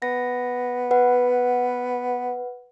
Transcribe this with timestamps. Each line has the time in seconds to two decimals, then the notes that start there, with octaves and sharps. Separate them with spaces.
0.02 B3 A#6
0.91 B4 F#5